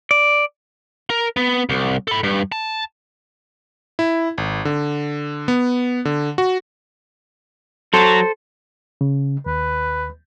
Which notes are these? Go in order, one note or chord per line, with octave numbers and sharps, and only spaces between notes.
D5
A#4
B3
C2
A4 B5
G2
A5
E4
G#1
D3
B3
D3
F#4
F#3 A4 C5
C#3
D#2 B4